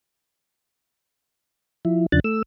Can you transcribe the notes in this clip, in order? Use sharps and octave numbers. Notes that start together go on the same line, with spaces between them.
F3 E4
E2 C#3 F3 D4 F#6 A6
A3 E6